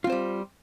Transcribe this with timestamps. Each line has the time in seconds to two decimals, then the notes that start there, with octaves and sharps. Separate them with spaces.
0.04 F4
0.07 C4
0.10 C5
0.12 G3